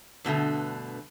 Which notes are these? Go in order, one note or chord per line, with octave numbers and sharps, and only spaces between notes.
G2 B2 D3 A3